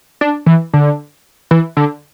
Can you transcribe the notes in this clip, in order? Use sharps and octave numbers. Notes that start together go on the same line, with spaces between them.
D4
E3
D3
E3
D3